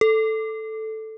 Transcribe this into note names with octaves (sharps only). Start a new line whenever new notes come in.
A4